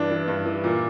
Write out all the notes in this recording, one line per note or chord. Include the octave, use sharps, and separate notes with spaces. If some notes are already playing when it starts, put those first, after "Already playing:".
Already playing: G2 E3 D4
E3
G2
E3
A#2